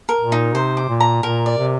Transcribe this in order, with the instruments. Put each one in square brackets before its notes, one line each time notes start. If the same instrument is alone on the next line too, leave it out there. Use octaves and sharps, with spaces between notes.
[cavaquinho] A#4
[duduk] A#2
[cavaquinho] D#4
[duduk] C3 [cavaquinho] C5
[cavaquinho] D6
[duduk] A#2
[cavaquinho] A#5
[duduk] A#2 [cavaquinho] A#4
[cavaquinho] D5
[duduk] C3